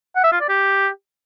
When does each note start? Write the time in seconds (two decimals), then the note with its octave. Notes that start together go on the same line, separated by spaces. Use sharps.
0.16 F#5
0.24 E5
0.32 F4
0.41 D5
0.49 G4